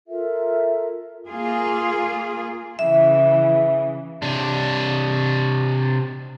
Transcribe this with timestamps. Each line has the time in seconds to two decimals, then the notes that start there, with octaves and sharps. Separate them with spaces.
0.08 F4 A4 A#4 E5
1.28 A#3 F4 G#4
2.79 C#3 E3 E5
4.22 C3 D4